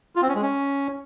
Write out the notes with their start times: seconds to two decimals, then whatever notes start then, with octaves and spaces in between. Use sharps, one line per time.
0.16 F4
0.22 C4
0.29 C#4
0.36 G#3
0.42 C#4